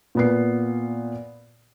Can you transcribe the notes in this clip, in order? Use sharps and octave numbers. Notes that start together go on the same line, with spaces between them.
A#2 B3 C7